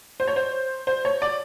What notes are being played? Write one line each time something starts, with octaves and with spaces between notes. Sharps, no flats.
C5
C#5
C5
C5
C#5
D5